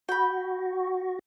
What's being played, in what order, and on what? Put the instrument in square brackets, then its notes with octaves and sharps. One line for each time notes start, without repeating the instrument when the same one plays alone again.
[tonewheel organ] F#4 [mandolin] G5 B5